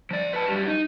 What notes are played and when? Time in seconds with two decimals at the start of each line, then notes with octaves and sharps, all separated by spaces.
0.11 F3 D5
0.33 B4 A5
0.48 F#2 G3
0.67 D#4